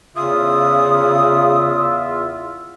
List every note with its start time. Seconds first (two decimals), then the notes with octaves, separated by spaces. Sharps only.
0.16 E2 C#3 F4 E5 D#6